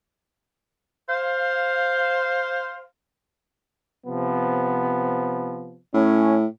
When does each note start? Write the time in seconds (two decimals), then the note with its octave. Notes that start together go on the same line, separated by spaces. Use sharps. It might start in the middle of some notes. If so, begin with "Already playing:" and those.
1.08 C5 F5
4.07 C3 F3 B3
5.94 A2 C#4